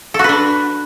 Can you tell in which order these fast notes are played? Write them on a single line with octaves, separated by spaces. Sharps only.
A4 F#4 B4 D4